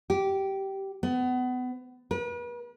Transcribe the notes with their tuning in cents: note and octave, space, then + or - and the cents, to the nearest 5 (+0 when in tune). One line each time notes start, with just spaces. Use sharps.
G4 -15
B3 +30
B4 -40